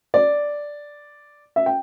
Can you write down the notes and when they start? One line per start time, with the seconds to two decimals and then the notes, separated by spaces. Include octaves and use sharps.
0.14 D5
1.56 E5
1.66 G5